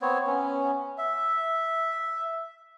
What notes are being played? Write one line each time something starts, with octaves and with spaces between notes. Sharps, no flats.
B3 C4 C#5
B3 C#4
E5